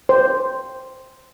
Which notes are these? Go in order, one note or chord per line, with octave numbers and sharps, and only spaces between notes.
C5